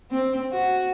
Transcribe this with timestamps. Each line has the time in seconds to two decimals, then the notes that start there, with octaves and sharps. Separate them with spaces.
0.11 C4
0.52 F#4